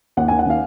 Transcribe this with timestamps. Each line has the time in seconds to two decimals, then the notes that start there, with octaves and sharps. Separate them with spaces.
0.17 D#2 F#5
0.28 G#5
0.31 D#3
0.39 F#5
0.46 D#3 F5